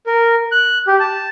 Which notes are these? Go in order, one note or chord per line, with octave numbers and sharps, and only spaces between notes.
A#4
F#6
G4
A5